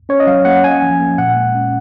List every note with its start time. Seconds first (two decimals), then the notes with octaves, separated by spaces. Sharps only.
0.09 C#4 C#5
0.20 D#5
0.27 F#3 F5
0.45 A#3 F#5
0.64 C#4 G#5
0.82 F3
1.00 A#3
1.18 A#2 F#5
1.36 G#3
1.55 C#4